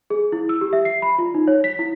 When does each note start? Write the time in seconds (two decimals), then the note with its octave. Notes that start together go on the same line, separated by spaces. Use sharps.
0.10 G#4
0.32 E4
0.49 E6
0.61 G4
0.73 E5
0.85 C7
1.02 B5
1.19 F4
1.34 D#4
1.47 C#5
1.64 B6
1.79 E4